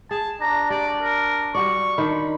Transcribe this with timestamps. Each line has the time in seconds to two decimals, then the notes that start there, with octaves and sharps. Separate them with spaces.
0.11 G#4 A5
0.41 D4 A#5
0.70 G4 D5
1.02 A#4
1.55 G3 F#4 D5 C#6
1.98 D#3 D4 B5